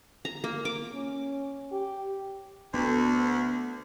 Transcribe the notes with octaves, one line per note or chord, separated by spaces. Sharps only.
A#5
A#3
D6
C#4
G4
D2 B3